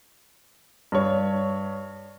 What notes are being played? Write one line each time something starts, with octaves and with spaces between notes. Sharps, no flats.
G2 C#5